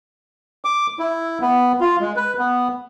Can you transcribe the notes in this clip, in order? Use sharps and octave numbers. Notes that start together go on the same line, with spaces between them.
D6
E4
B3
F4
G#3
B4
B3